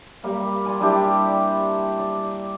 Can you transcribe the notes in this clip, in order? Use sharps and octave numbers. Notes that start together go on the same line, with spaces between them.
G3 A#3 F5
D5 G#5 C6
G3 D4 E4 G4
D5